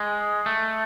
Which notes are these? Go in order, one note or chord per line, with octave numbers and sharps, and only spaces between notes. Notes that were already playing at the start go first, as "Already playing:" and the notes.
Already playing: G#3
A3